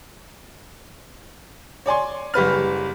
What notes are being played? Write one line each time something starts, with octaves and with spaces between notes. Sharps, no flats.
C#5 D5 G#5 C6
F#1 G3 B4 F6